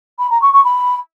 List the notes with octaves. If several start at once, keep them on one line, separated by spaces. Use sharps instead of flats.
B5
A#5
C#6
C#6
B5